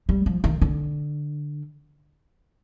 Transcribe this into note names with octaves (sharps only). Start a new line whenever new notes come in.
G3
F3
D#3
D3